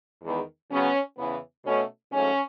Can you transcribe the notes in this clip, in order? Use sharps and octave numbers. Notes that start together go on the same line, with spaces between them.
E2 D#3 G#3 B3
C#3 F#3 B3 C#4
E2 C#3 E3 B3
B2 A3 C#4
G#2 F#3 A3 C#4